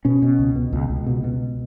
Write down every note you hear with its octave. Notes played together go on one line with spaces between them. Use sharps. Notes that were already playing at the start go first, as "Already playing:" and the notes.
B2 C#4
B2
C#2
B2
C#2
C#2
B2
B2